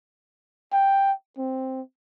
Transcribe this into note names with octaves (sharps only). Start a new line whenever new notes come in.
G5
C4